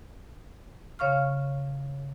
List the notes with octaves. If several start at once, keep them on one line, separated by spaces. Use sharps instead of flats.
C#3 C#5 F5 C#6 F6